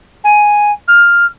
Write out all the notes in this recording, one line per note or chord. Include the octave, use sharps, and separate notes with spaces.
G#5
F6